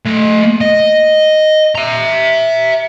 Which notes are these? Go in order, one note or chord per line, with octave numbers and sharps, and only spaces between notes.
A3 D#5
D#5
E5 A#5